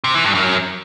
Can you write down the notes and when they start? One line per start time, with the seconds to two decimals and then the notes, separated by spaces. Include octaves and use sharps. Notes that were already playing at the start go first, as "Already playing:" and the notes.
0.04 C3
0.14 E3
0.25 G2
0.35 F#2